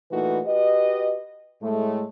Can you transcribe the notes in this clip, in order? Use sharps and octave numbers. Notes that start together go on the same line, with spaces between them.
A#2 E3 A3 D#4 F#4 B4
F#4 G4 B4 D#5
A2 G#3 A3